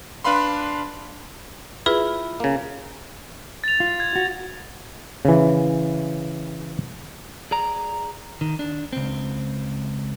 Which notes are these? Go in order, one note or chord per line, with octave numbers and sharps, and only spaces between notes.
D4 B4 F5 B5 C6
E4 F4 G#4 B4
C#3 A#3
A6 F7
F4
G#6
F#4
C#3 E3
G#4 D5 A#5
D#3
D4
C#2 C4